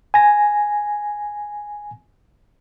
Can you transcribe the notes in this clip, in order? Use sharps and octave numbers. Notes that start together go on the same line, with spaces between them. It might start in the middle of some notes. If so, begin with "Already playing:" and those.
G#5 A#6